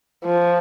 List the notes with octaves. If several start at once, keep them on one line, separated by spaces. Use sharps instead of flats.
F3